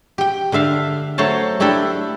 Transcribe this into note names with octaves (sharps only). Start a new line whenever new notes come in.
G4 G5
D3 D4 E5 F5
F#3 A3 C5 C#5 A5
A3 D4 E4 G4 A4